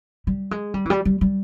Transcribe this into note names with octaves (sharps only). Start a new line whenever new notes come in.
G3
G#3
G3
E3
G3
G3
G3